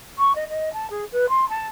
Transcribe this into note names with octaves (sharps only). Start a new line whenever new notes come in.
C#6
D#5
D#5
A5
G#4
B4
C6
A5